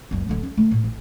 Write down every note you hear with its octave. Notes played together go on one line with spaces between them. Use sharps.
F#1 C#2
D1 D3
C#4
D3 A3
A2
A1